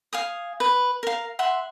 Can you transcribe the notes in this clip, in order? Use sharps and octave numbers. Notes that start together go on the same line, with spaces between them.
F5 G#5 D#6
B4
A#4 F5
E5 F#5 C6